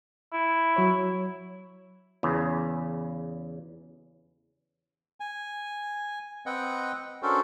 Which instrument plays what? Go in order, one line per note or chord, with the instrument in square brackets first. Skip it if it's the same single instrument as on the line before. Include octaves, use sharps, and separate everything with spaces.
[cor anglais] E4
[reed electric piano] F#3 C#5
[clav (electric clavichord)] E2 C#3
[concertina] G#5
C4 B4 D#5 F#5 G5
C#4 D4 F#4 A4 A#4 C5